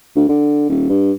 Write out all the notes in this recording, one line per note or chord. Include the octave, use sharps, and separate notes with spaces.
D2
D3
D#1
G2